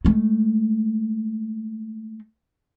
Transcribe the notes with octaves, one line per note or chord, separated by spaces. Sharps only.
G#3 A3